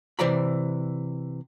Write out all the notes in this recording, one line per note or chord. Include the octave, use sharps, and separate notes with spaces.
C3 E3 C5 D5 A#5 B5